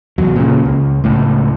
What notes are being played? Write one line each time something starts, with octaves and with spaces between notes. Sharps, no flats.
F1 E2 F#3
A#2 C#3
C#2
C#2 A2